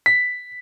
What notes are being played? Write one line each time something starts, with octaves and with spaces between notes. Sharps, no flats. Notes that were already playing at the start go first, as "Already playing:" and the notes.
B6